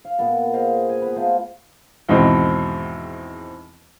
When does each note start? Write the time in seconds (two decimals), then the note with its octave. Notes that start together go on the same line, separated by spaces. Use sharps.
0.05 F5
0.19 A#2 B3 A4
0.53 G#4 C5 D#5 F5
0.89 G#5
1.02 B3 B4
1.16 A3 F4 C5
2.09 E2 G#2 B2 D#3 C4